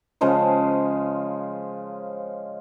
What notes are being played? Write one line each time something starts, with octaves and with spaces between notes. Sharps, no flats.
C#3 F3 G#3 C5